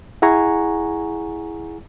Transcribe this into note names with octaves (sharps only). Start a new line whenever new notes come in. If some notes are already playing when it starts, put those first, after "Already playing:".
E4 G#4 F#5 G#5 A#5 C#6